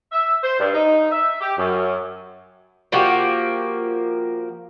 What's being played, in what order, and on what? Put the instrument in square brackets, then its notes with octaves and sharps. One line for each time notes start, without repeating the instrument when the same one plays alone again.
[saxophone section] E5
C5
G2
D#4
E5
G4
F#2
[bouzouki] F3 A#3 F#4 G4